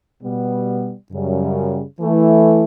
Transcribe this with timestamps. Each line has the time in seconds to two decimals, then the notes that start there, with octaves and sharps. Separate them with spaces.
0.23 B2 G3 B3
1.11 F#2 C#3 G3
1.99 E3 A3 E4